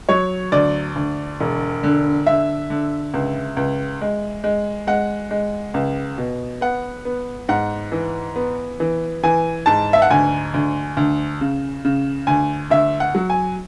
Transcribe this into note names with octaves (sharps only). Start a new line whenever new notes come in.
F#3 C#5
D2 D5
D2
E1
D3
D3 E5
D3
C#2
C#2
G#3
G#3
G#3 F#5
G#3
C#2
B2
B3 F#5
B3
G#2 F#5
E3
B3
E3
E3 G#5
G#2 A5
E5
F#5
D2 G#5
D2
D2
C#3
C#3
D2 G#5
D2 E5
F#5
F#3
G#5